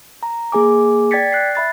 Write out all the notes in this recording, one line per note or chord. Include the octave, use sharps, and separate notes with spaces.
A#5
A#3 G#4 G#5 D6
D5 G5 G#6 A6 B6 C#7
F#6 C7
E5 B5 A6